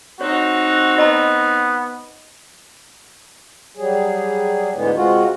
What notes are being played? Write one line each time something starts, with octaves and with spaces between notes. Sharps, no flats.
C4 D#4 F#4 C#5
B3 D#5 A5 A#5
F#3 G3 G#4
D2 G#2 D3 E3 G#3 B3
C3 G#3 F4 F#4